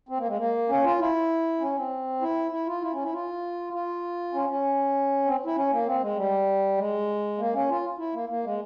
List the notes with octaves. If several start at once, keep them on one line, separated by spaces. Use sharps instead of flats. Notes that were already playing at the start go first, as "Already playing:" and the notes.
C4
A#3
G#3
A#3
C#4
F4
E4
C#4
C4
E4
E4
F4
E4
C#4
E4
F4
F4
C#4
C#4
C4
E4
C#4
A#3
C4
G#3
G3
G#3
A#3
C#4
F4
E4
A#3
A#3
G#3